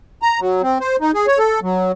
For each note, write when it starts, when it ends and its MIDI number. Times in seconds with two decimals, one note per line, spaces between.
0.22 0.40 82
0.40 0.62 54
0.62 0.78 60
0.80 0.96 72
1.00 1.11 63
1.14 1.26 68
1.27 1.38 73
1.38 1.60 69
1.62 1.92 54